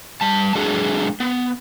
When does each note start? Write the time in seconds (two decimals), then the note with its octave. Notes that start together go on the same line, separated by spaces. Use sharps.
0.21 G3 A5
0.55 F#3 G#3 D4 F#4 G#4 A4
1.20 B3